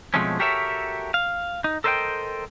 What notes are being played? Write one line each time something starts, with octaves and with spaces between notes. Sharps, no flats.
B2 F3 G#3 A3 C4 C#4
F#4 G4 A4 A#4 C#5 E5
F5
D#4
A4 A#4 C5 D#5 F5 G5